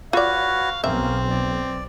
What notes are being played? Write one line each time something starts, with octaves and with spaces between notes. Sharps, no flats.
F4 F#4 B4 C#5 D5 F5
B1 A#3 C4 C#4 A#4 E5
D5